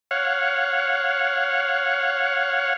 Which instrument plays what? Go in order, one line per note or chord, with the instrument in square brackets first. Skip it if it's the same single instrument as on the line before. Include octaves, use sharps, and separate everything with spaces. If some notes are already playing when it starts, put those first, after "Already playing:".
[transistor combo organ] C#5 F5 F#5